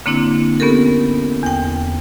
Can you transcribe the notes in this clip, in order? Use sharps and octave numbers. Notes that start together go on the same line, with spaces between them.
D3 A#3 C4 D4 E4
B3 C#4 G4 A4 A#4
E2 G5